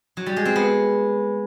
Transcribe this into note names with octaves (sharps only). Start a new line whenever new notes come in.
F#3
G3
G#3
C4
B3